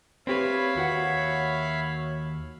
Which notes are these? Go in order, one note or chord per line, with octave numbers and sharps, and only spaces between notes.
C4 G4 B4 C#5 E5 F5 B5
D#2 F#4 F#5